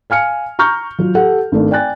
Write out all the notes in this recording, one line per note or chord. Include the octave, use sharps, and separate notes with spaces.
F5 G#5 F6 C#7
A#5 C#6 F6 G6
F#3 F4
G4 A4 F#5
G#1 A3 D4
D5 G5 G#5 F#6 A6